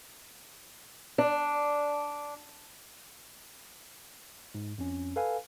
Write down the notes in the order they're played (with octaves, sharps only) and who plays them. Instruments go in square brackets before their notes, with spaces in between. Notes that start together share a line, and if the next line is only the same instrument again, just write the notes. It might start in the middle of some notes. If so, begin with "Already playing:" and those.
[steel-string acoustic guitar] D4
[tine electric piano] G#2
F2 C#4
A4 B4 F5 G#5